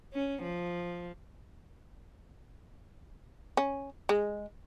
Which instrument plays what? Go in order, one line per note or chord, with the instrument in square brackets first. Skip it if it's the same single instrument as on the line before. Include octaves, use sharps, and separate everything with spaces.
[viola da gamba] C#4
F3
[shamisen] C#4
G#3